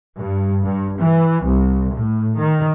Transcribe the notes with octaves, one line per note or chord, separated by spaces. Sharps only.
G2
G2
E3
C2
A2
D#3